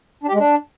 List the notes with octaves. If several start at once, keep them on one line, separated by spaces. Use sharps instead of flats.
D4
G4
G#3
D4